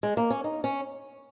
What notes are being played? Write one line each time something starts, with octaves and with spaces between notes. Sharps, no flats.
G#3
A#3
C#4
D#4
C#4